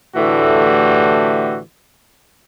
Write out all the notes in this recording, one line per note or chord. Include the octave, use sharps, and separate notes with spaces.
A2 D3 E3 A3 F#4 G4